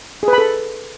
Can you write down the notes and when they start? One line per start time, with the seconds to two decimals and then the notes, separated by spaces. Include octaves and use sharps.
0.23 G#4
0.28 B4
0.33 B5
0.38 A4